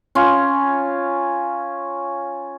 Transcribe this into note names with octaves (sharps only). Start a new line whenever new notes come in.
C#4 F4